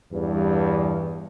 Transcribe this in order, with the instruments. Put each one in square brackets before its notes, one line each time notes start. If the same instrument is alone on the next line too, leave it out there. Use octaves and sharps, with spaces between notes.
[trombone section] E2 G2